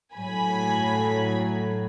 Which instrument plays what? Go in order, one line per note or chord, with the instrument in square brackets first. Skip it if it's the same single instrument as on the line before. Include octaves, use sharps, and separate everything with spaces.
[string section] A2 F#3 G#5 B5